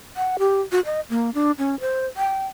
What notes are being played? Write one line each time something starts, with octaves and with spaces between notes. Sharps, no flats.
F#5
G4
F#4
D#5
A#3
D4
C#4
C5
G5